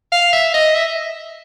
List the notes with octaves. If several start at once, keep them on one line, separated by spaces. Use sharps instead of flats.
F5
E5
D#5
E5